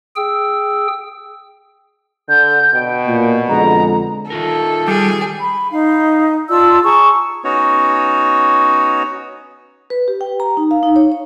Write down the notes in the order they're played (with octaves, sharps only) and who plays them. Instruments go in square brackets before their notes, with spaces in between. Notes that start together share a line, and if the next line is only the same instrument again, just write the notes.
[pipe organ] G#4 G5 E6
[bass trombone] D3 [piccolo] G6
[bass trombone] B2 [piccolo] G5
[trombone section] A#2
[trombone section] F2 D3 G#3 [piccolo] A#5
[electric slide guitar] D#3 F4 A#4 [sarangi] A4
[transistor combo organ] G3 [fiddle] G#4
[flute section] B5
D#4 F5
F4 D5 A5 E6
G#4 A5 A#5 C#6
[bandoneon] B3 C#4 D#4 F#4 C#5
[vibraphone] B4
G4
G5
A#5
D#4
F5
D#4
C#5
C#5